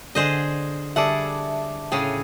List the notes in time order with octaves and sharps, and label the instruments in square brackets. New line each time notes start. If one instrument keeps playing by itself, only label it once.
[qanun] D3 F#5 [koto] G#4 C5 D#5
[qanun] D3 G3 A4 [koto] G#4 F#5 [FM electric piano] E5 A5 D6
[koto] A2 C#3 G#4 [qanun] G5